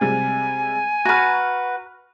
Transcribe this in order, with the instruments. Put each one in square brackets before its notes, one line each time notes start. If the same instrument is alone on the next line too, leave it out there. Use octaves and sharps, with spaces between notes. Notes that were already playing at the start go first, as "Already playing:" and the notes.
[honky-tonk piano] C3 G3 G#3 [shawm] G#5
[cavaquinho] F#4 B4 [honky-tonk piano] A#5 C#6 F6